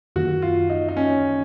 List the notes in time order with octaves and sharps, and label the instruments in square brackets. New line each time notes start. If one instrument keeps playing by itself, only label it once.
[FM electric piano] F#2 D#3 A#3 [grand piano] F#4
[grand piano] F4
D#4
D#4
C#4